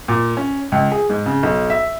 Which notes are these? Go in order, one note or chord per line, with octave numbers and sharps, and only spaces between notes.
A#2
C#4
C#2
G#4
G#2
C#3
B1
E5